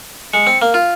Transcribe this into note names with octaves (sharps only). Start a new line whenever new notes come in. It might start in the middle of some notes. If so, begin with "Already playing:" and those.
G#3 C#7
C4
A#3
F4